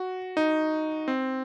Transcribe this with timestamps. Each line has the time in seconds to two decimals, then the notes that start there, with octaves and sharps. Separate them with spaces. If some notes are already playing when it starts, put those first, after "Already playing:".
Already playing: F#4
0.37 D#4
1.08 C4